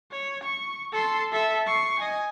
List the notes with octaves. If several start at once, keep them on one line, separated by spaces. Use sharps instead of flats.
C#5
C#6
A4 C6
A4 E5
C#6 C7
D#5 G#5